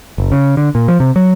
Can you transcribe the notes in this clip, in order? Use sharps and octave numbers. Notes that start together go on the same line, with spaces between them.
F#1
C#3
D3
A#2
F3
C3
F#3